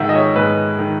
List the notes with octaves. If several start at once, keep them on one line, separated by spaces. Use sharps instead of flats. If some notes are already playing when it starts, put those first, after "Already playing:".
Already playing: G#2 D#3 E5 F#5
D#5
C#5
G#2 B4
D#3